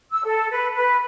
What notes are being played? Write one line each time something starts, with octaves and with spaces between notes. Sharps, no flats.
E6
A4
B4
B4